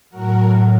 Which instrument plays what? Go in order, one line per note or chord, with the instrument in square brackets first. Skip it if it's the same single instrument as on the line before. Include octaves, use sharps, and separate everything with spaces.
[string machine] A2 F#3 F#4 A#4